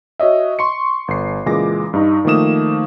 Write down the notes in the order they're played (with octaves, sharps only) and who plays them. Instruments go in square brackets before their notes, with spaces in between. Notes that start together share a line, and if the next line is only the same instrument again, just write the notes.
[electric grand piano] F#4 C#5 D#5 E5
C6 C#6 C#7
G1 C7
C#2 A#2 E3 G#3 D6 A#6
G2 D#4
D#3 F3 A3 A#3 D#6 E7